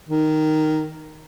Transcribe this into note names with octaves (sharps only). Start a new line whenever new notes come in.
D#3